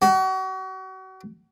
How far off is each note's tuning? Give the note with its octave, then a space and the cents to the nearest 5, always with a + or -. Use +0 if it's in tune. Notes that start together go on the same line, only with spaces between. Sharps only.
F#4 +35